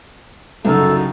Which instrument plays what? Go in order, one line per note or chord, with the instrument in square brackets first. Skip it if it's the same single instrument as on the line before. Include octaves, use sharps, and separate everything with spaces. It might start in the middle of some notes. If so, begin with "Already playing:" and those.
[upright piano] C2 F#2 C#3 [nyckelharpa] D#4 F#4 [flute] A4